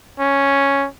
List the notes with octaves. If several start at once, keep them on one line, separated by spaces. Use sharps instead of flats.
C#4